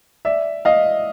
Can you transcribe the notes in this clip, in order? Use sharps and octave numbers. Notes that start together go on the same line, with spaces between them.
D5 E5
D#5 F5